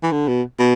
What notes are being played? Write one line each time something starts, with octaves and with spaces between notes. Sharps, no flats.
E3
D3
B2
B2